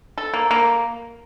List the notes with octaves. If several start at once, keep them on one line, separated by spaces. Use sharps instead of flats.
A4
A#3
A#3